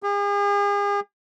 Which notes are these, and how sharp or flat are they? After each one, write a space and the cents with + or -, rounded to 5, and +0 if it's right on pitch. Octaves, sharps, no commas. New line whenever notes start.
G#4 -40